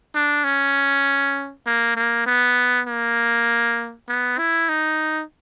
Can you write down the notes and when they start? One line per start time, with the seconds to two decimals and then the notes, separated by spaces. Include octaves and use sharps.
0.15 D4
0.44 C#4
1.66 A#3
1.96 A#3
2.26 B3
2.87 A#3
4.08 B3
4.38 E4
4.69 D#4